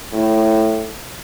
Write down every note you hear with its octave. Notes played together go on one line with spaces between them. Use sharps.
A2